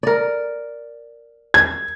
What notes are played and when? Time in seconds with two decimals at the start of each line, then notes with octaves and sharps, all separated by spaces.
0.03 A#4 D5
1.54 G#6